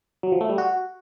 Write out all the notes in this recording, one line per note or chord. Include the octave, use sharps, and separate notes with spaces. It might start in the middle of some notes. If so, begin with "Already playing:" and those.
F#3
F3
A3
G3
F#4